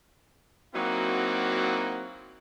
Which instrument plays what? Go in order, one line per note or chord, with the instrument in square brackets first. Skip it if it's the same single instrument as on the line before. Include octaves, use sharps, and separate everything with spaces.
[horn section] F#3 A#3 C4 D#4 E4 F#4